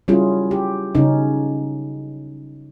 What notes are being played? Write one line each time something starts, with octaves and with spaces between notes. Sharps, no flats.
F#3 G3 C#4 E4 F4 G#4
G4
C#3 F#3 C#4 D#4